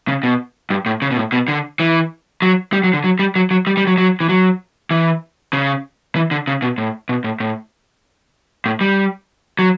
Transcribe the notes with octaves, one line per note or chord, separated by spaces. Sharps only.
C#3
B2
G2
A2
C#3
B2
A2
B2
D3
E3
F#3
G3
F#3
D3
F#3
G3
F#3
F#3
G3
G3
F#3
F#3
E3
F#3
E3
C#3
E3
D3
C#3
B2
A2
B2
A2
A2
A2
G3
F#3